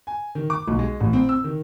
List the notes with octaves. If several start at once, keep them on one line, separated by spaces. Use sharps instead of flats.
G#5
D#3
D6
B1
G#3
A1
C4
E6
D#3